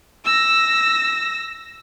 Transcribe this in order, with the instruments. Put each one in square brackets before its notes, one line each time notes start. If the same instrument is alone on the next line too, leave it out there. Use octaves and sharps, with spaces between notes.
[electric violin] E6 A#6